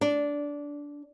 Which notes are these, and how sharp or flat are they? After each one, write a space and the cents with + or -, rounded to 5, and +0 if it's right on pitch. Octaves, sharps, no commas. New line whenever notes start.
D4 -15